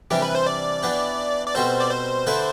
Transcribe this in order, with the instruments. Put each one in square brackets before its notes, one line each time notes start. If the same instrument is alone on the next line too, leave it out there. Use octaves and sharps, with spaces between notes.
[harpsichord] C3 E3 G3 D4 [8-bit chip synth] G4
[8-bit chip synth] B4
C5
D5
[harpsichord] E3 B3 D4 G4
[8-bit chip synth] D5
[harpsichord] B2 G3 C4 F#4 A4 [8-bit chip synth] C5
[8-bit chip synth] D5
C5
[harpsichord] D3 A3 E4 B4 D5